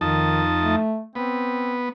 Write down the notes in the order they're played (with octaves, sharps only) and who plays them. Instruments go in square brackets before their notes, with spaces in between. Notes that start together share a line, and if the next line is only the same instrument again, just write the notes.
[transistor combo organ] F2 D#4 A5 [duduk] D#3
[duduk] A3
[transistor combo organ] B3 [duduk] C4